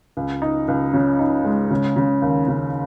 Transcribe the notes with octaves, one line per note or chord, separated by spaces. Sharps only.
C#2
D#4
C#2
C#3
D#4
G#3
C#3
C#3
D#2
C#3